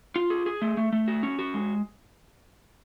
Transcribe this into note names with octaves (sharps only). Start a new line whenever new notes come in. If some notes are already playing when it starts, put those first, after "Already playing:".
F4
G#4
G#4
A3
A3
A3
F#4
C#4
F#4
G#3